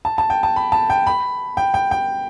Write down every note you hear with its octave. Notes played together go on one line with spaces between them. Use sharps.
A5
A5
G5
A5
B5
A5
G5
B5
G5
G5
G5